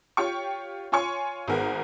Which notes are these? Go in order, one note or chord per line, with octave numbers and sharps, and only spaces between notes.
F4 G4 C#5 G5 C#6
F4 C#5 G#5 C6 C#6
G#1 B3 G#4 A#4 F#5